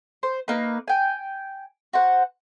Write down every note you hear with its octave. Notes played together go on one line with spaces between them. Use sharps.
C5
A#3 D#4 B4
G5 G#5
F#4 C5 F#5